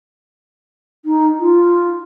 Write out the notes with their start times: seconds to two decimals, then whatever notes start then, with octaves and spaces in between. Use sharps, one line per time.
1.05 D#4
1.39 F4